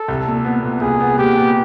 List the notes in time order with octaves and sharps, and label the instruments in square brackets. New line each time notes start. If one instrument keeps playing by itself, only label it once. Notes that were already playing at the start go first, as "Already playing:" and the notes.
Already playing: [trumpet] A4
[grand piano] C2
A#2
B3
A#2
[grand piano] C2 [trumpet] G#4
[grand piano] B3
[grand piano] A#2 [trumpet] G4
[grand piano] B3